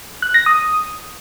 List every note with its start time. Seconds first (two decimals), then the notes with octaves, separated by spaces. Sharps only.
0.22 F#6
0.34 A#6
0.46 D#6